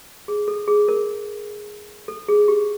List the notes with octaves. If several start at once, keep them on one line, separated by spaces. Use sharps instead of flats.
G#4
A4
G#4
A#4
A4
G#4
G4